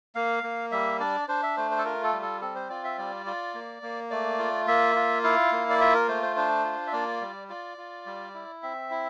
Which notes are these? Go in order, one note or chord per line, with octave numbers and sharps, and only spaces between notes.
A#3 F5
A#3
G3 E5
D4 D5
D4 C5
E5
A3 C5
C5
A4
F4 A#4
A4
G3
A4
C4 A4
C5
F4 D5
E5
G3 D5
F4
A#3
A#3
A3 D5
F4
A#3 E5
F4
E4 F5
A#3
D5
F4 E5
A#4
A3 C5
C5
D4 C5
F4
E5
A#3 D5
G3
F4 D5
F4
G3
E4
C4 E5
E4